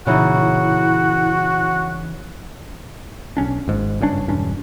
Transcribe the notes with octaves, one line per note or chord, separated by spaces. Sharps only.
A#2 C#3 E3 D#4 E4 F#4
B1 C#4 D4
G#1 G#2
F#1 G2 C#4 D4
E1 G2 C#4 D4